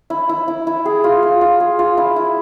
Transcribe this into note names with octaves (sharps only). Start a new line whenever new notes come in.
E4
E4
E4
E4
G#4
F4
F4
F4
G#4
F4
E4
E4